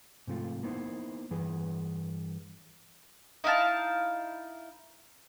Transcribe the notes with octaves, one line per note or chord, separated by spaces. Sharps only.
G#2 C3 F3 A3 F4
A#3 B3 D#4 E4 C5
G2 E3 G#4 B4
D#4 E4 F5 A5